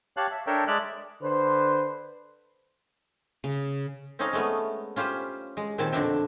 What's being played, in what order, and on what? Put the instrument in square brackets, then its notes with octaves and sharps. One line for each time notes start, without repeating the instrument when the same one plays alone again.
[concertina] G4 C#5 F5 A5 F#6
E5
D4 A4 A#4 C#5 E5 G5
G#3 D5 E5 F6 F#6
[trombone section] D3 B4 C5
[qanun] C#3
[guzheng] C4 C#4 D#4 C#5 D#5 F5
G#3 A3 B3
C#4 F4 G4 B4 C5
G#3
A#2 D#3 C4 G#5 A5 B5
F2 B2 D3 D4 E5 G5